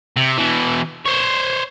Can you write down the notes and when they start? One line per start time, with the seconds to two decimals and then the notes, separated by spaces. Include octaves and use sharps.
0.17 C3
0.38 B2 E3
1.05 C5 C#5